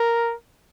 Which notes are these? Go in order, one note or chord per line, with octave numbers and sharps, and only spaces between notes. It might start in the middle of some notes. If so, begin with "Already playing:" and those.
Already playing: A#4